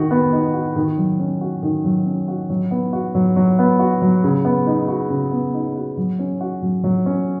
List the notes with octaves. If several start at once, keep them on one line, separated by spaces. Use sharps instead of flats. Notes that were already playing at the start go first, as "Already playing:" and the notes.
Already playing: D#3 F#4
B3
D#4
F#4
D#3
F#3
C#4
F#4
D#3
F#3
C#4
F#4
F#3
B3
F#4
F#3
F#3
B3
F#4
F#3
C#3
B3
D#4
F#4
C#3
B3
D#4
F#4
F#3
C#4
F#4
F#3
F#3
C#4